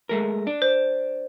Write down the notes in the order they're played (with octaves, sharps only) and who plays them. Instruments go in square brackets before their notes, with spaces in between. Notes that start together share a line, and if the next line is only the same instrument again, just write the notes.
[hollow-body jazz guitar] G#3 A3 A#4
D4
[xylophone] C5